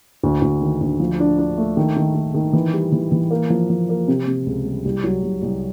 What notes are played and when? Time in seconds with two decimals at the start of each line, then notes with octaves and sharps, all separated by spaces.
0.23 D2
0.42 D2
0.62 D#3
0.81 D2
1.00 F3
1.20 D4
1.39 D4
1.58 A3
1.77 D#3
1.97 D#3
2.15 D#3
2.34 D#3
2.53 E3
2.73 G3
2.92 E3
3.12 E3
3.31 A#3
3.50 F3
3.70 F3
3.89 A#3
4.08 C3
4.27 C3
4.46 C#2
4.65 G3
4.85 C2
5.04 F#3
5.23 C2
5.42 C2